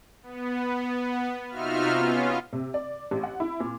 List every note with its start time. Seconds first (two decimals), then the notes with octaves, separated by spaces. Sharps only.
0.23 B3
1.49 C3 D#4 F4 F#4 E5 F6
1.90 B3 C#4 F4
2.53 C3
2.74 D5
3.11 A1
3.23 F#5
3.40 E4
3.60 A#2